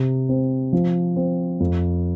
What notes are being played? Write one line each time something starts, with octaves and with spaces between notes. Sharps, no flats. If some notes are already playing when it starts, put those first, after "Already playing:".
Already playing: C3
C4
F3
C4
F2